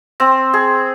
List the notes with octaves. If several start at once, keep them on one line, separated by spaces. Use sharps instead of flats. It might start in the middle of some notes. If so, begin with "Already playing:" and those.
C4
G#4